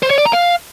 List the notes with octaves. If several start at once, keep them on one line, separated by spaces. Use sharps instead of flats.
C5
C#5
D5
A#5
F5